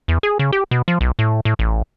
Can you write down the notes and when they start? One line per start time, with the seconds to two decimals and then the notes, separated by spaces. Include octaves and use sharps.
0.08 E2
0.23 G#4
0.39 C#3
0.52 G4
0.71 B2
0.88 F3
1.01 B1
1.19 A2
1.45 A2
1.59 A1